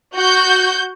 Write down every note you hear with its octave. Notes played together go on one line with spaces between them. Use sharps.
F#4 G6